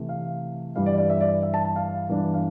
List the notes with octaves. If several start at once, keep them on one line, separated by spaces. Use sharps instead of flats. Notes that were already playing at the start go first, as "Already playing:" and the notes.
Already playing: C3 E3 A3
F5
G2 E3 G3 F5
D5
D5
E5
D5
E5
A5
A5
F5
G2 E3 B3 D4
F5